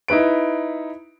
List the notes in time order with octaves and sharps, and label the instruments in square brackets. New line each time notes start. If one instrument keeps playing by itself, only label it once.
[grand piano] D#4 E4 B4 D7